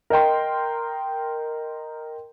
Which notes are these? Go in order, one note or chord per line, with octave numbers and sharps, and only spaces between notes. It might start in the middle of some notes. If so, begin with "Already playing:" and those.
A#4 D#5 G5 C6